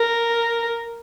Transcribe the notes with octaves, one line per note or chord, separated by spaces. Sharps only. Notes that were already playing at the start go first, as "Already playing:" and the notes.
Already playing: A#4